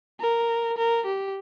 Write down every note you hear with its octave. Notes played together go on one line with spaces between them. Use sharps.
A#4
A#4
G4